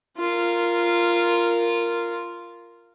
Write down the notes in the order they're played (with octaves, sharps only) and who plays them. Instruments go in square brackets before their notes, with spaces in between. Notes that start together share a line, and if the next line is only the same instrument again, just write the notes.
[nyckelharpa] F4 A#4